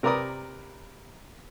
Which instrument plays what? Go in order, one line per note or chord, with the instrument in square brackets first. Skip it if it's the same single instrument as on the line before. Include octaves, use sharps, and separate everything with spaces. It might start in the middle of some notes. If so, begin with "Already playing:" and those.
[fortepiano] C3 A#4 B4 D5 A#5 D#6